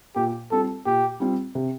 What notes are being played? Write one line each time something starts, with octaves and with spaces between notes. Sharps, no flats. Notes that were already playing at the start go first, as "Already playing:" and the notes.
A#2 G4
G3 C4 F4 A4
A#2 G4
G3 C4 F4
C3